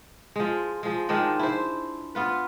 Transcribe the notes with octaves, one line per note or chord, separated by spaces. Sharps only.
F3 G#3
F3 G#3
D#3 F3 G#3 D4
E4 C5
B3 F4 B4